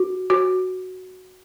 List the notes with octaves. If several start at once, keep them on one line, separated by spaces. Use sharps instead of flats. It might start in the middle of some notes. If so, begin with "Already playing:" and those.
Already playing: F#4
F#4